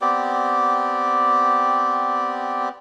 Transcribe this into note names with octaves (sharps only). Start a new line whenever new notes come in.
B3 C4 G4 D5